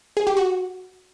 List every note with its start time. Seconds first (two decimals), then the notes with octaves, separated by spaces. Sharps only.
0.17 G#4
0.27 G4
0.37 F#4